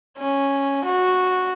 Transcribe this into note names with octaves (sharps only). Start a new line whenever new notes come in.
C#4
F#4